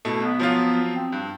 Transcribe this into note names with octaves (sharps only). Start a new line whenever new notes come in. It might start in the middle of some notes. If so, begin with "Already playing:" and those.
B2 A3 E4
B1 B3
F3 F#3 F4
C4
G2